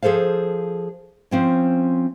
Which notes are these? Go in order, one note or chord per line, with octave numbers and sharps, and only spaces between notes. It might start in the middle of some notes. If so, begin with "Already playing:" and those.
F3 G#4 A4 C5 F5
F3 C4 C#4